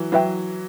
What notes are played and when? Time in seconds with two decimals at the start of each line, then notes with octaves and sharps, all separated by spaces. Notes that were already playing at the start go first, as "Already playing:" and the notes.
Already playing: E3 F#3
0.12 F#3 E4 B4 E5 G5